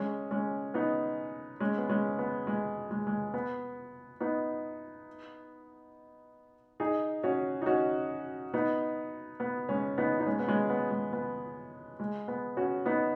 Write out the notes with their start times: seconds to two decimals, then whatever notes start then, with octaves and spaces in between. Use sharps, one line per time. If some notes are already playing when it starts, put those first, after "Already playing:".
Already playing: G#3 C#4
0.31 G#3 C#4
0.74 B3 D#4
1.60 G#3 C#4
1.78 B3
1.89 G#3 C#4
2.18 B3
2.47 G#3
2.91 G#3
3.07 G#3
3.34 B3
4.20 B3 D#4
6.80 D#4 G#4
7.23 C#4 F#4
7.62 D#4
7.66 C#4 F#4
8.54 B3 D#4
9.40 B3
9.69 G#3 C#4
9.98 B3 D#4
10.20 D#4
10.26 G#3 C#4
10.39 B3
10.48 G#3 C#4
10.70 B3
10.91 G#3
11.13 B3
12.00 G#3
12.28 B3
12.57 C#4 F#4
12.86 B3 D#4